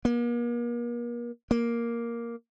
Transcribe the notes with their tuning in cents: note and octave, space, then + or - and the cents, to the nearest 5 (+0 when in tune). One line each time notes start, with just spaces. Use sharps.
A#3 +40
A#3 +5